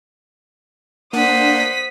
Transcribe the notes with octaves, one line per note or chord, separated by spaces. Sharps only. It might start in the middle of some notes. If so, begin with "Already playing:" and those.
A#3 D4 C5 F#5 D#6 B6